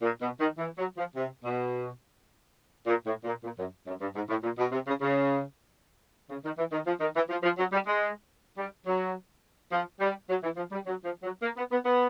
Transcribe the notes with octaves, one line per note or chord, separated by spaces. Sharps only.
A#2
B2
D#3
E3
F#3
F3
C3
B2
A#2
A2
A#2
A#2
F#2
F#2
G2
G#2
A2
A#2
B2
C3
C#3
C#3
C#3
D#3
E3
D#3
F3
D#3
E3
F3
F3
F#3
G3
G#3
G3
F#3
F3
G3
F#3
E3
F3
G3
F#3
F3
F#3
A#3
B3
B3
B3